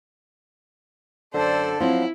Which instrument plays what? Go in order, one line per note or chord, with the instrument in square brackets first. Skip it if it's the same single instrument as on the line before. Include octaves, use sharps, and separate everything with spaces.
[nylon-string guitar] F#2 [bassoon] D3 [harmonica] A4 D5 [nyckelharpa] C5
[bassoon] F3 [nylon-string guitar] F#3 C4 F4 [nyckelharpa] E4